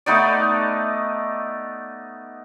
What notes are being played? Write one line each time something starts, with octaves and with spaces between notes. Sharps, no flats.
A3 B3 D#4 D5